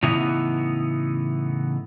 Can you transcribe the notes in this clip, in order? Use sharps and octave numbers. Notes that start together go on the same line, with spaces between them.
A2 C#3 E3 B3 D#4 E4